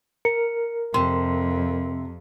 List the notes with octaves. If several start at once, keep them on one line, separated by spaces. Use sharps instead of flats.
A#4 C#7
F2 C3 C6